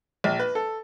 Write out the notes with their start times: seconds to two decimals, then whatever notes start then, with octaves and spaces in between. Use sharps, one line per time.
0.24 A#1
0.39 B4
0.55 A4